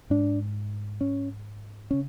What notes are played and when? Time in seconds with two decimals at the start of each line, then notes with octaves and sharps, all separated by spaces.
0.10 G#2 D4
1.01 C#4
1.91 C#3 C#4